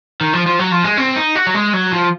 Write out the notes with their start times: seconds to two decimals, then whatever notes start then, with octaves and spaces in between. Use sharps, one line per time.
0.21 D#3
0.33 F3
0.46 F3
0.59 F#3
0.72 F3
0.84 G#3
0.97 C4
1.16 D#4
1.35 F#4
1.47 F#3
1.54 G#3
1.73 F#3
1.93 F3